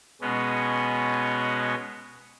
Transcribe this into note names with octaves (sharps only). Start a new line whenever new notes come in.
B2 G#3 B3 C#4